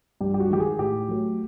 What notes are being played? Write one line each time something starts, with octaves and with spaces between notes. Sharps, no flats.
G2 G4
G4
F#4
D#3 G#3 G4
G#4
A2 G4
F#3 A3